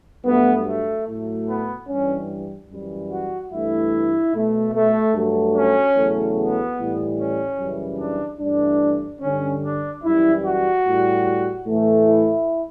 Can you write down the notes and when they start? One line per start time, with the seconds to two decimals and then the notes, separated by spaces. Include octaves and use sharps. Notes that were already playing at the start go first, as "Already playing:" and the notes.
0.25 G2 F#3 A3 B3
0.65 A3
1.06 A2 F#3 A3
1.47 B3
1.88 G2 E3 G3 C#4
2.69 F#2 E3 G3
3.11 F#4
3.52 G2 E3 A3 E4
4.33 B2 A3
4.73 A3
5.14 G2 F#3 A3
5.54 C#4
5.96 E2 C#3 F#3 A3
6.37 B3
6.77 A2 E3 G3
7.17 C#4
7.58 F#2 C#3 E3 G3
7.99 D4
8.40 G2 E3 A3 D4
9.21 G2 D3 G3 C#4
9.63 D4
10.03 F#2 E3 G3 E4
10.43 F#4
10.84 A2 G3
11.66 A2 E3 A3
12.07 E4